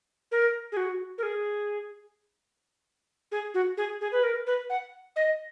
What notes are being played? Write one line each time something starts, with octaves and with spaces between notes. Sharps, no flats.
A#4
G#4
F#4
A#4
G#4
G#4
F#4
G#4
G#4
B4
A#4
B4
F#5
D#5